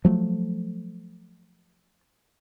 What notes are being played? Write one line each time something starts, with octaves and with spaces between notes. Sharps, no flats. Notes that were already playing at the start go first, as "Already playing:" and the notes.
F3 F#3 A3